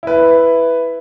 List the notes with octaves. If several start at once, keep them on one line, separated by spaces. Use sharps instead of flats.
E4 B4